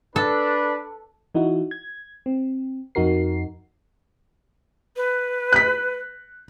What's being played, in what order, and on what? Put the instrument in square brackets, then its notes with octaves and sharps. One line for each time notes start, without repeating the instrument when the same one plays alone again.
[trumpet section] D4 B4 [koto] A4
[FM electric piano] E3 D#4 E4 F#4
G#6
C4
F2 D#4 F#4 A#4 C7
[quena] B4
[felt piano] F#6 B6